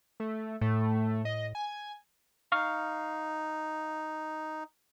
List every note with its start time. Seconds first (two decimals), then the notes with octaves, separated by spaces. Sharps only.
0.20 A3
0.61 A2 A3
1.25 D#5
1.55 G#5
2.52 D#4 F5 C#6 F6